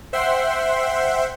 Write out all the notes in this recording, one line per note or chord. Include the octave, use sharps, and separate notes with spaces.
C5 E5 F#5 G5 C6